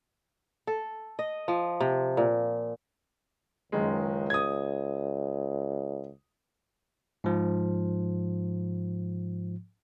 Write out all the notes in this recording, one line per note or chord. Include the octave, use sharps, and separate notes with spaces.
A4
D#5
F3
C3
A#2
F#1 C#2 D#3 G#3
D#6 G#6
G#2 F3